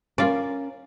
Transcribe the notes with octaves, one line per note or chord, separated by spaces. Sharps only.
C#4 F4 A#4 D5